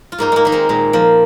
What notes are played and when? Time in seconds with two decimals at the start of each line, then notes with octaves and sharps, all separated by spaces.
0.12 F4
0.18 G#2 A#3 D#4
0.32 G#3 A#3
0.45 D#3 D#4
0.52 G#3 C4
0.69 A#2 G#3
0.93 F3 A#3